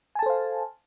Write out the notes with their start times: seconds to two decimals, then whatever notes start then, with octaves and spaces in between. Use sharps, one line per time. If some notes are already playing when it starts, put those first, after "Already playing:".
0.15 G#5
0.19 A5
0.23 A4
0.26 C5
0.30 F5